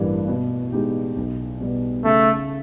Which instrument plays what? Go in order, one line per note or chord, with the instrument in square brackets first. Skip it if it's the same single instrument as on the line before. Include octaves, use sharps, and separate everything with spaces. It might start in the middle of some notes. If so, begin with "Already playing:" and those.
Already playing: [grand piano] A1 G2 E3 G3 A#3
B2
G#3 B3 D#4 G4
B1
B2 G3 B3
[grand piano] C#3 [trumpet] A3